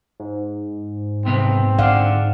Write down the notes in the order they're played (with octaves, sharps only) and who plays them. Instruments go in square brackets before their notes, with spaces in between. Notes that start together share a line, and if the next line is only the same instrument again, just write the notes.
[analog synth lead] G#2
[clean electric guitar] B1 C3 B3 [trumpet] C4
[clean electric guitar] D3 D4 [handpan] D5 F5 F#5